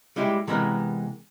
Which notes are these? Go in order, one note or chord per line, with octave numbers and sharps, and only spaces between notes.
G3 G#3 E4 G4
C3 E3 G#3 B3 A#4